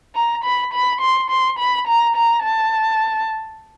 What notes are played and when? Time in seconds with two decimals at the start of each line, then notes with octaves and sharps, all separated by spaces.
0.15 A#5
0.44 B5
0.73 B5
1.01 C6
1.30 C6
1.59 B5
1.87 A#5
2.16 A#5
2.43 A5